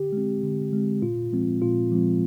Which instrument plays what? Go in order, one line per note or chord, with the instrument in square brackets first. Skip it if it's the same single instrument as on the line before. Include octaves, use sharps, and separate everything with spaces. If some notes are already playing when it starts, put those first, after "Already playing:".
Already playing: [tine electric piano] D3 G4
G#3 C4
D3
G#3 C4
A#2 F4
F3 G#3 C4
A#2 F4
F3 G#3 C4